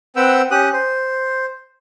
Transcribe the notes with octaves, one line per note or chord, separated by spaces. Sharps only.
C4 B4 F#5 G5 E6
C#4 G4 D#6 F#6
C5